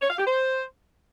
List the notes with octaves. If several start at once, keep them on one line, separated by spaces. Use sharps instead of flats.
C#5
F5
G4
C5